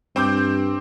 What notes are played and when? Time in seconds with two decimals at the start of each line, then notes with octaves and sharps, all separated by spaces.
0.16 G2 C4 D6 G6